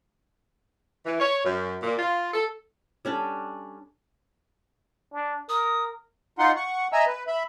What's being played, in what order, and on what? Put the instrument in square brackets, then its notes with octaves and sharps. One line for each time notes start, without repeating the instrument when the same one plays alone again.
[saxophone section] E3
C#5
F#2
A#2
F4
A4
[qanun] G3 C#4 D4 A4
[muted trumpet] D4
[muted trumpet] A#4 [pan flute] D#6
[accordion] D#4 F4 F#5 C6
F#5 C#6
D#5 E5 G#5 A#5 E6
B4
E5 B5